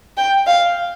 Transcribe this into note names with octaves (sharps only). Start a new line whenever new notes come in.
G5
F5